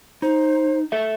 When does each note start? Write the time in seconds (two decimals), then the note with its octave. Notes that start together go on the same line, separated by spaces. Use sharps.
0.22 D#4 C5
0.92 A4 E5